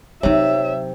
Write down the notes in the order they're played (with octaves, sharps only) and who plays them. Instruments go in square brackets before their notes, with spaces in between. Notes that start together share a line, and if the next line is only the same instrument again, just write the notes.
[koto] C3 [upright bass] F#3 D#4 [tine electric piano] C#5 [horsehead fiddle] E5